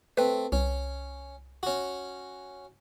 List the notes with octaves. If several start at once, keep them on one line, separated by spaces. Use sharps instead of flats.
A3 C4 B4
C2 C#4
C#4 F#4